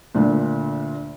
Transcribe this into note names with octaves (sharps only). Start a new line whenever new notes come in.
D2 A#2 D3